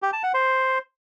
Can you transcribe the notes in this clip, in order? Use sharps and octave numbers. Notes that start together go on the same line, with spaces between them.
G4
A5
F#5
C5